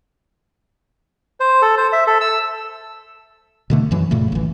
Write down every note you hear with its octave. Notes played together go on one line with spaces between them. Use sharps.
C5
A4
C5
E5
A4
E6
B2 D3 A3
F#2 E3 F#3
F#2 A#2 C#3 A3
A1 E3